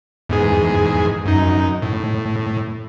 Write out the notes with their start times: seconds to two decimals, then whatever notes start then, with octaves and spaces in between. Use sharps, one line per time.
0.29 E2 G#2 G#4
1.25 F#2 D#4
1.82 A2